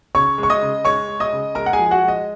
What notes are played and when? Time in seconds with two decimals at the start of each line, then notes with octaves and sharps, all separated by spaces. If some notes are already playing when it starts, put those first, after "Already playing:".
0.15 C#3 C#5 C#6
0.38 G#3 C#6
0.50 D#5 D#6
0.62 C#3
0.85 G#3 C#5 C#6
1.08 G#3
1.20 D#5 D#6
1.33 C#3
1.55 G#3 A#4 A#5
1.66 F#5
1.73 G#4 G#5
1.79 F3
1.91 F#4 F#5
2.03 G#3
2.08 D#5